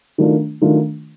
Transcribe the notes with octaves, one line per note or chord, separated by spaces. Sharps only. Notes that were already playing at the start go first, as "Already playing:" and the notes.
D#3 F#3 A3 D4 F4
D#3 F#3 A3 D4 F4